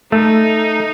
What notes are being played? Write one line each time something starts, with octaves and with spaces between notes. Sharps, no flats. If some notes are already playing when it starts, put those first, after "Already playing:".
A3 D#4